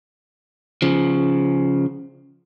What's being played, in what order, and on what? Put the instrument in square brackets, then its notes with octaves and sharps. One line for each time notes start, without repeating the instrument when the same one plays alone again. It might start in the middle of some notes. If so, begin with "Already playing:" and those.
[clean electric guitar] C#3 F3